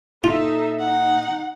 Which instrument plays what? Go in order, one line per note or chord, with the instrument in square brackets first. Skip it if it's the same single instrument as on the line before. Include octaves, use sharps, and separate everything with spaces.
[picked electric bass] A#2 [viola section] D#4 A4 E5 [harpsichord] F4
[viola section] D#4 [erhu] F#5